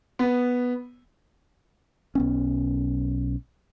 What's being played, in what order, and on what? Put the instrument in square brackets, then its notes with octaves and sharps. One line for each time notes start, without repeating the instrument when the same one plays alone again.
[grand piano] B3
[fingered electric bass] B1 B3 C#4